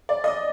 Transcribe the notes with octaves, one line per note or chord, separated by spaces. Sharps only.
D5
D#5